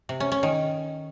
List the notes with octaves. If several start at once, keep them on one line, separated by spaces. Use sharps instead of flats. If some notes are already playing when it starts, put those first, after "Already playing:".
C3
C#4
C#4
D#3